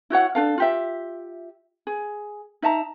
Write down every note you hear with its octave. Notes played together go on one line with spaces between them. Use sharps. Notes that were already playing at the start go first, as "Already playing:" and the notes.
E4 F#4 C#5 F#5
D4 A4 F5
F4 G4 E5
G#4
D#4 E5 A5 A#5